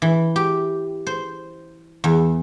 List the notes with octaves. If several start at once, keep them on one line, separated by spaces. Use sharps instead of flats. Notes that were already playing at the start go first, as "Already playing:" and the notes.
E3
G4
C5
E2